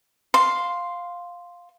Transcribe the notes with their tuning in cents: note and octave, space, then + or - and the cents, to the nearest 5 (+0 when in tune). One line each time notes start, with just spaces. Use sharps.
F5 +10 C6 +0